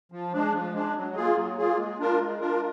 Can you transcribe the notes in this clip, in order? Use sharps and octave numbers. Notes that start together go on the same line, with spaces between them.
F3
G#3 D4
F3
G#3 D4
F#3
A#3 F4 G#4
F#3
A#3 F4 G#4
G#3
D4 F4 A#4
G#3
D4 F4 A#4